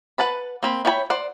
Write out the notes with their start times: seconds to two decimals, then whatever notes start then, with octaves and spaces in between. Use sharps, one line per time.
0.18 B4 F#5 A5 B5
0.63 A#3 C4 B5
0.85 E4 C#5 G5 A5 B5
1.10 C5 D5 F#5